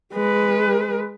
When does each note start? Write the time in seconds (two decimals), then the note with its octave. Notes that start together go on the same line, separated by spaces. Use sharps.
0.13 G#3 B4